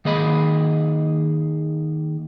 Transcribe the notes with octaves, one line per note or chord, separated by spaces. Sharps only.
D#3 A#3 G#4 D#5 B5